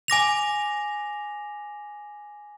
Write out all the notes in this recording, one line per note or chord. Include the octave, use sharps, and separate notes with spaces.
G#5 D6 A#6 F7